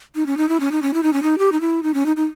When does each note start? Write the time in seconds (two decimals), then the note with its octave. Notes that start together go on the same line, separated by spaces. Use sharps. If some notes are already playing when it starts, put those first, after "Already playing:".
0.15 D#4
0.26 C#4
0.37 D#4
0.49 E4
0.60 C#4
0.72 D#4
0.82 C#4
0.94 E4
1.03 D#4
1.13 C#4
1.23 D#4
1.38 G4
1.52 D#4
1.61 E4
1.83 D#4
1.94 C#4
2.06 D#4
2.16 D#4